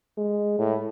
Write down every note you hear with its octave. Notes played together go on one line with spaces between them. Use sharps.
G#3
A2